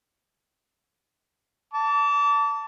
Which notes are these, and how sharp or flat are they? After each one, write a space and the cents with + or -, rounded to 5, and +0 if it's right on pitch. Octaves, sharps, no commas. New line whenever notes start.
A5 +15 D6 -35